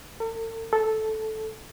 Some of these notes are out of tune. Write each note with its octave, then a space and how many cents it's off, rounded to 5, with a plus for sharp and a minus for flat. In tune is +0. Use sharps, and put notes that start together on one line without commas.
A4 +45
A4 -10